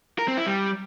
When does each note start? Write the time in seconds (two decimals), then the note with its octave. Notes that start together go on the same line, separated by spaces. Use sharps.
0.19 A#4
0.28 C4
0.37 E4
0.46 G3